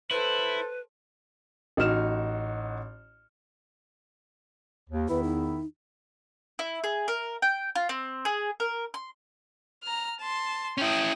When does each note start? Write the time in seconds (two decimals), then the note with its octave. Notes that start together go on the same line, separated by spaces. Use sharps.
0.11 E4 A4 B4 C5
1.77 A1 D#4 F#4 F6 E7
4.90 D#2
5.09 E2 D#3 E4 B4
5.23 D#4
6.59 E4
6.84 G#4
7.08 A#4
7.42 G5
7.75 F4
7.89 C4
8.25 G#4
8.60 A#4
8.94 C6
9.83 A#5 F6
10.20 A5 C6
10.78 C#4 E4 G5 D#6